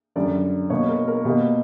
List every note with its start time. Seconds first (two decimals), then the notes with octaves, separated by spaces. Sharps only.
0.16 F#2 D3 G3 D5
0.70 B2 A#3 C#5
0.89 A#4
1.08 A#4
1.25 B2 A#3 G4